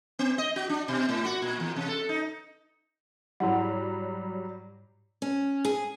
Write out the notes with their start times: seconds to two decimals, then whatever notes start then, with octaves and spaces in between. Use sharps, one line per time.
0.19 B3
0.38 D#5
0.56 F#4
0.70 D4
0.88 B2
1.09 A2
1.25 F#4
1.42 A#2
1.60 E2
1.76 C3
1.88 A4
2.09 D#4
3.40 G#2 F#3 G3 E4 F#5
5.22 C#4
5.65 G#4